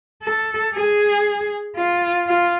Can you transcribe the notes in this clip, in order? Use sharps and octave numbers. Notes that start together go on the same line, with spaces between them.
A4
G#4
F4
F4